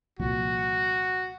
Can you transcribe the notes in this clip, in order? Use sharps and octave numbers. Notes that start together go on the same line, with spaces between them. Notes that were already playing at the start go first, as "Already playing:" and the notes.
C2 A#2 F3 F#4